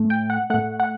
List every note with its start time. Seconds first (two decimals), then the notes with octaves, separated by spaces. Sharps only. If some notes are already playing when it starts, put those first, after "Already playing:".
Already playing: A2 A3
0.10 G5
0.30 F#5
0.50 A2 A3 F#5
0.80 F#5